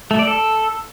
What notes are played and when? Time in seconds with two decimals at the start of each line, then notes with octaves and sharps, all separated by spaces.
0.11 A3
0.19 D5
0.27 A4